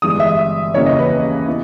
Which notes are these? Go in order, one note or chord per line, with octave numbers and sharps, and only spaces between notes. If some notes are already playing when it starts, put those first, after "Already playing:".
G1 G2 E3 G#3 D#6
E5
D#2 C#3 E3 A#3 E4 C#5
D#5
B4
B3 E4